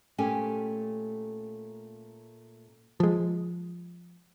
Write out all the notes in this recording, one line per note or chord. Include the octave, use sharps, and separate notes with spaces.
A#2 A3 C#4 G4 A4 G#5
F3 G#3